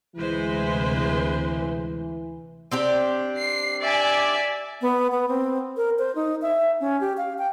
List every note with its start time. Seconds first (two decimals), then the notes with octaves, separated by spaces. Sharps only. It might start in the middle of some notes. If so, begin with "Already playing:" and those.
0.16 D2 C3 E3 G#3 B4 C5
2.71 C4 D4 G4
3.36 C7
3.82 D5 E5 G#5
4.82 B3
5.12 B3
5.28 C4
5.77 A#4
5.99 C5
6.15 D#4
6.42 E5
6.80 C#4
7.01 G4
7.17 F5
7.38 G5